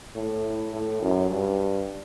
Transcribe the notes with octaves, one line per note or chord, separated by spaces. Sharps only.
A2
A2
F#2
G2